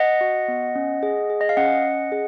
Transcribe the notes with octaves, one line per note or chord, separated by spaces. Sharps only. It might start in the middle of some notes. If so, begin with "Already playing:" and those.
Already playing: D#5 F#5
F#4
B3
C#4
G#4
G#4
D#5
F5
C#4 D#5 F#5
C#4
G#4